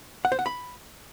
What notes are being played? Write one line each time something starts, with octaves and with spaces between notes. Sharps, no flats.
F#5
C5
F#5
B5